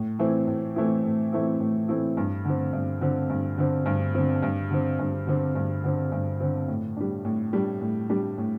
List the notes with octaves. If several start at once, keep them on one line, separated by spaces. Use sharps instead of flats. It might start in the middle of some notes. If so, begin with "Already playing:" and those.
Already playing: A2
E3 A3 C4 E4
A2
E3 A3 C4 E4
A2
E3 A3 C4 E4
A2
E3 A3 C4 E4
G2
D3 C4
G2
D3 C4
G2
D3 C4
G2
D3 C4
G2
D3 C4
G2
D3 C4
G2
D3 C4
G2
D3 C4
A2
G3 D4
A2
G3 D4
A2
G3 D4
A2